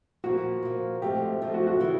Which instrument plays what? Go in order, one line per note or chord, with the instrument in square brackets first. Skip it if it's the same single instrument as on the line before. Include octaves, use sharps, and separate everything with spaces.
[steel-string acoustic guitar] A#2 F3 A#3 [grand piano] F#4
[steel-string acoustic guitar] A#2 F3 A#3
[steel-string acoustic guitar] G#2 F3 A3 C4 [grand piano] G4
[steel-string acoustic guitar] G#2 F3 A3 C4
[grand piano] F#4
F#4
[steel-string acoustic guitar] C#3 E3 G3